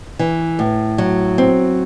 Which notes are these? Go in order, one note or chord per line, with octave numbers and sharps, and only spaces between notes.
E3
A2
F#3
C4